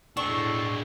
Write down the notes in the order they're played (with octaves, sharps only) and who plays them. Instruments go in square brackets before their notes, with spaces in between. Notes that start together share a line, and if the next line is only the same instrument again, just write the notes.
[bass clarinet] A2 [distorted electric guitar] G#3 D4 [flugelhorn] A4 [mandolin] C#6